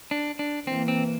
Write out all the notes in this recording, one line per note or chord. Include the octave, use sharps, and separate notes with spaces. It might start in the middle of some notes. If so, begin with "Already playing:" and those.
D4
D4
E3 A#3 C4
C4